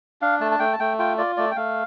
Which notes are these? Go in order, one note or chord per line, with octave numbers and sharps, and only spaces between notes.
D4 F5
A3 A5
A5
A3 G5
A5
A3 G5
F4 G5
F4 D5
A3 D5
G5
A3 F5